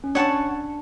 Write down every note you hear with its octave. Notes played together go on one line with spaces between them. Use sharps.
C#4
D4 C#5 F#5 A5 C#6